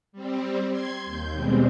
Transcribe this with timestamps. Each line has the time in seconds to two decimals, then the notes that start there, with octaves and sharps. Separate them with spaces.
0.13 G3 C4
0.71 C6 G#6
1.06 D#2 G6
1.34 B2 G3 G#3 C4